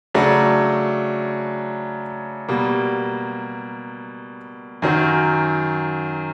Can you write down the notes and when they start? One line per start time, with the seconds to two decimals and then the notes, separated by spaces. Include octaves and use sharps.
0.14 C#3 F#3 A3 D4
2.49 B2 G3 A#3
4.82 F#2 D#3 F#3